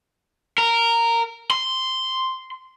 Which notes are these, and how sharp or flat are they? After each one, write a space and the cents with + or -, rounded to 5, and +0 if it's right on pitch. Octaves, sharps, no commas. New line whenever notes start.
A#4 -10
C6 -5